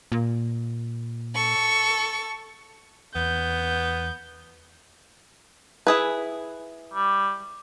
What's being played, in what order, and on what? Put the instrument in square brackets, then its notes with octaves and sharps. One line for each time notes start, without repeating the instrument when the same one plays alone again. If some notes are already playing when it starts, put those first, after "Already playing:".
[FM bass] A#2
[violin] A4 C#6
[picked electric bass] E2 [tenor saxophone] B3 [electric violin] G6
[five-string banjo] E4 G#4 B4
[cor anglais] G3